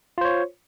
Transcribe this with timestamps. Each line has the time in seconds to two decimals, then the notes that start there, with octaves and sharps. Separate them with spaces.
0.18 F4
0.21 C5
0.25 C#5